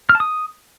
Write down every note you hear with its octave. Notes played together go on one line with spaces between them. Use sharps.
F6
A5
D#6